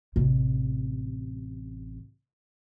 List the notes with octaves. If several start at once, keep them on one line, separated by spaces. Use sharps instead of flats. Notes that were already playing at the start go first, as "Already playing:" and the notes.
A1 C3